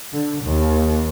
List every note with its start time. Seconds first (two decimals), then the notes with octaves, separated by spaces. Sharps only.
0.15 D3
0.44 D#2